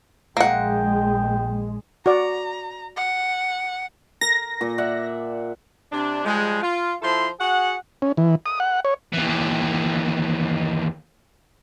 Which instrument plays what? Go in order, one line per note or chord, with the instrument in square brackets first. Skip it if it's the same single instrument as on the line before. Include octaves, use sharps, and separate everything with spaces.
[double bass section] A#1 G#3 [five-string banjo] A#3 F#5 [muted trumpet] G5
[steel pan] F#4 D5 [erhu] A#5
[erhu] F#5
[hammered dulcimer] A#4 [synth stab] A#6
[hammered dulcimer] A#2
D5 E5 F#5
[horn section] C3 D4
F3 G3 G#3
F4
F3 E4 A4 C5 C6
F#4 G#4 F#5
[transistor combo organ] C#4
E3
D#6
F#5
C#5
[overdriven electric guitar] D#2 E3